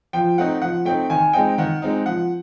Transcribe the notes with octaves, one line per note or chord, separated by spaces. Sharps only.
F3 G5
A3 C4 D#4 F#5
F3 F#5
A3 C4 D#4 G5
D#3 G#5
G#3 C4 D#4 G5
D#3 F#5
G#3 C4 D#4
F3 F#5